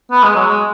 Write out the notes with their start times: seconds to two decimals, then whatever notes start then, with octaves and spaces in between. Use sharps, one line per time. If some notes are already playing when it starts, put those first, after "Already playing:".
0.11 B3
0.23 G#3
0.36 F#3
0.48 G#3